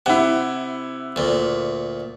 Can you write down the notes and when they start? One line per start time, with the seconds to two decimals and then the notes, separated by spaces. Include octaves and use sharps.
0.06 C3 E4 F#5
1.16 D2 A#2